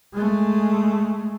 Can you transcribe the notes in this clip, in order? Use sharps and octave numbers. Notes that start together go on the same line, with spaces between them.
G#3 A3